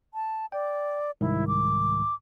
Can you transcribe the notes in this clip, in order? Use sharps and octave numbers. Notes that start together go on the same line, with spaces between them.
A5
D5 G5
C2 G#2 D#3 E4
D6